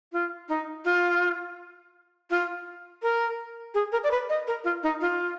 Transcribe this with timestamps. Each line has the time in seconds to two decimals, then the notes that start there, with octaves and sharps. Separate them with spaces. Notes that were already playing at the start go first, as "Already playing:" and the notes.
0.13 F4
0.49 D#4
0.85 F4
2.30 F4
3.03 A#4
3.74 G#4
3.92 A#4
4.04 D5
4.11 B4
4.29 D#5
4.47 A#4
4.64 F4
4.83 D#4
5.01 F4